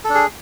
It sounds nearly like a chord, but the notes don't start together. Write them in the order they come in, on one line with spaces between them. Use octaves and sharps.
A4 D4 G#4